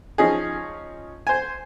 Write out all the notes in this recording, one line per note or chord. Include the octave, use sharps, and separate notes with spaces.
F3 C#4 D#4 G#4
C5 G#5